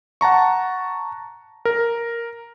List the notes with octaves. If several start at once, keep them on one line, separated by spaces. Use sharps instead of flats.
F#5 A5 A#5 C#6
A#4